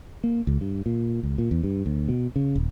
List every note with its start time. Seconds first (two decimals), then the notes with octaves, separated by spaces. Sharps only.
0.24 A#3
0.47 C#2
0.61 G2
0.86 A#2
1.23 C#2
1.38 A#2
1.51 E2
1.63 G2
1.86 D2
2.08 B2
2.36 C#3
2.56 D#1